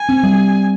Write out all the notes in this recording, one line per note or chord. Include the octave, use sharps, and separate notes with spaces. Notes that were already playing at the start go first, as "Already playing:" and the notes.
Already playing: G#5
C4
G3